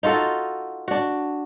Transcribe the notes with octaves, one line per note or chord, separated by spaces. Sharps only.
D#4 F4 F#4 A4
D4 F#4